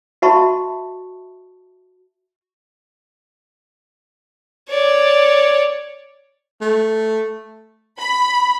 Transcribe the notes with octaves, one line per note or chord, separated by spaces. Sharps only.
F#4 D#5 E5 A5 B5 C#6
C#5 D5
A3
B5